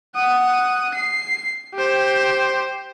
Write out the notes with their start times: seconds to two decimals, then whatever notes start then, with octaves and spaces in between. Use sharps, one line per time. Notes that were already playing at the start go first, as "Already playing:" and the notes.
0.15 F#5 D#6
0.94 C7
1.74 G4 C5